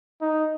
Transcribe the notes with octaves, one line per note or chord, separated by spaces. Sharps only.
D#4